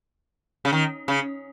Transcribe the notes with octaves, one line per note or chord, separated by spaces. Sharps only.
C#3
D#3
C#3